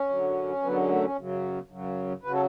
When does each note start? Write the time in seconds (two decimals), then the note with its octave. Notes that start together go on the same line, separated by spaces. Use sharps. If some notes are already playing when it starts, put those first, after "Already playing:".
Already playing: C#4
0.09 F#2 D3 F#3
0.62 F#2 D3 F#3 B3
0.76 G#3
0.89 A3
1.03 C#4
1.16 F#2 C#3 F#3
1.70 F#2 C#3 F#3
2.23 C#3 F#3 B4
2.33 A4